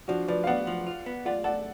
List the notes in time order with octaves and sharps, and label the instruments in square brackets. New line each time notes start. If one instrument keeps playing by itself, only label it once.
[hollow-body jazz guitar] F3 [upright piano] D4 F#4
[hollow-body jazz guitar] F3 [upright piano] B4 D5
[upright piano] F5
[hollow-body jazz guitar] B3 [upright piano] D5 F#5
[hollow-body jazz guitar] F3
F4
B3
[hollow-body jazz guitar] F4 [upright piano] D5 F#5
[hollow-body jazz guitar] A4 [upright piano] D5 F#5